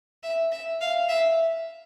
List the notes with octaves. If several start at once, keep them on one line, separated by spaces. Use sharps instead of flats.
E5
E5
F5
E5